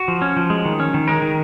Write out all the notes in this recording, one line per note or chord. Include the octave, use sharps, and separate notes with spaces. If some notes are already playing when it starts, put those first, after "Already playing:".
Already playing: F#4
F3
C#4
F3
G#3
D#3
C#4
D#3
G#3 A#4
D#3